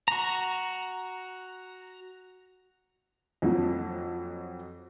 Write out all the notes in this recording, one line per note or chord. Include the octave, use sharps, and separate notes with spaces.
F#4 A#5
F2 F3 F#3